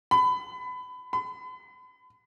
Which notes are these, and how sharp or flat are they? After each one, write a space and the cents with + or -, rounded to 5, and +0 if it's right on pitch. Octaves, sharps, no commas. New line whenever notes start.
B5 +25
B5 +40